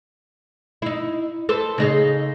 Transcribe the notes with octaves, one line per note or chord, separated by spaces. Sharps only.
D#4 E4
A4 B4 C5
C#3 D#4 G#4